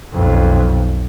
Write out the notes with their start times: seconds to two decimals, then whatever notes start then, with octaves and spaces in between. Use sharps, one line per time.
0.12 B1 F2